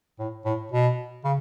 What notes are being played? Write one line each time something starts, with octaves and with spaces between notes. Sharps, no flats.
A2
A2
B2
C#3